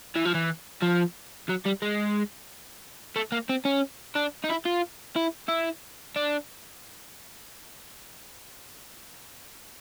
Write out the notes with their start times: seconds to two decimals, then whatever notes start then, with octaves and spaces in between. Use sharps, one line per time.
0.16 E3
0.25 F3
0.34 E3
0.82 F3
1.49 F#3
1.66 G3
1.82 G#3
3.16 A3
3.32 A#3
3.49 C4
3.65 C#4
4.15 D4
4.44 D#4
4.49 E4
4.65 F4
5.16 E4
5.49 E4
6.16 D4